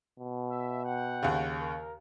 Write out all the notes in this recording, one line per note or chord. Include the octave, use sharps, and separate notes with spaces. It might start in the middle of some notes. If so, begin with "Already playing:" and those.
B2
E5
F#5 G5
D#2 C#3
A#4